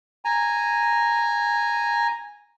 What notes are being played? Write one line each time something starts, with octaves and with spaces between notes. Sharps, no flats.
G#5 A#5